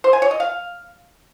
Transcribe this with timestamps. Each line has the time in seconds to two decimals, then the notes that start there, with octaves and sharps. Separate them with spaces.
0.04 C5
0.13 G#5
0.22 C#5
0.31 D#5
0.40 F5